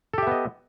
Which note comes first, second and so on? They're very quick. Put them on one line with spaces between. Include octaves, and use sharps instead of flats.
A4 G4 E5 B3 D#5